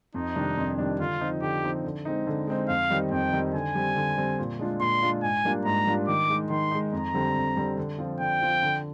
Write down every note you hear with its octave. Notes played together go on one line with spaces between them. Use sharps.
F2 D#4
C3 D#3 G3 D4
F2
C3 D#3 G3 D4
D3 F4
F3 C4 D#4
D3 G4
F3 C4 D#4
D3
G#3 C4 D#4
D3
G#3 C4 D#4
F2 F5
D#3 G3 C4 D#4
F2 G5
D#3 G3 C4 D#4
D3 G#5
G3 C4
D3
G3 C4
A#2
G#3 D4 F4
A#2 C6
G#3 D4 F4
G#2 G#5
G3 A#3 D4 F4
G#2 A#5
G3 A#3 D4 F4
D#3 D6
G#3 D#4
D#3 C6
G#3 D#4
F2 A#5
D3 G3 C4
F2
D3 G3 C4
D3
F3 C4 F4
D3 G5
F3 C4 F4
D3